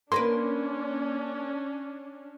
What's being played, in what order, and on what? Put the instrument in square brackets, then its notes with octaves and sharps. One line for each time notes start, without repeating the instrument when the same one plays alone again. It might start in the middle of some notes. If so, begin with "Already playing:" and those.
[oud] A#3 A#4 B4 [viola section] C#4 D4 [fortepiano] C6